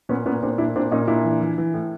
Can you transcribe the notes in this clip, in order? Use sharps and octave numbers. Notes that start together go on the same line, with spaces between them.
A#2 B3 C#4
A#2 B3 C#4
A#2 C4 D4
A#2 D4 E4
A#2 C4 D4
A#2 C#4 D#4
A#2 D4 E4
E3
E3
E3
A2